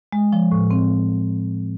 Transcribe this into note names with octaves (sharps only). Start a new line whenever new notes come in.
G#3
F3
A2
C4